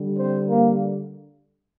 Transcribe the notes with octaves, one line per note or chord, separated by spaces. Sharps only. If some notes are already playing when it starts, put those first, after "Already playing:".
Already playing: D3 G3
C4 C5
A#3 A#4